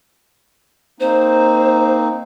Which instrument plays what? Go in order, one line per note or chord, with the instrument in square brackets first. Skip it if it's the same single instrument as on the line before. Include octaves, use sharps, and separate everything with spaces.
[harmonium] A#3 C4 D#4 [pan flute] C5